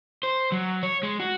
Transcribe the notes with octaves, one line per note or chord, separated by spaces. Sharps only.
C5
F#3
C#5
G#3
F#4